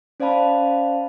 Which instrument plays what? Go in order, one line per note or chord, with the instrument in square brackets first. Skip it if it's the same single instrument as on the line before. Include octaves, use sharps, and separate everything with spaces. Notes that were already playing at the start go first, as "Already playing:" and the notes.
[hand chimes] C#4 C5 D5 F5 A5 B5